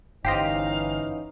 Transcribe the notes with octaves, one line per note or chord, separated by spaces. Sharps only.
G1 E3 C#4 D#4 G4 C5 D#5 F5